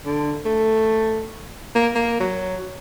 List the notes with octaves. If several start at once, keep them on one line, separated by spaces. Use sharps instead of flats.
D3
A3
A#3
A#3
F#3